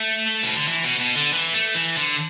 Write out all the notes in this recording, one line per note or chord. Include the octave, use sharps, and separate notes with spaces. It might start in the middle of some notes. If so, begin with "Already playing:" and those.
Already playing: A3
B2
D3
E3
B2
B2
D3
E3
A3
E3
D3